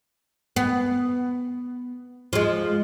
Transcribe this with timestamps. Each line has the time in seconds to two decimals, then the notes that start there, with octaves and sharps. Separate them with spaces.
0.56 B3
2.33 F3 G#3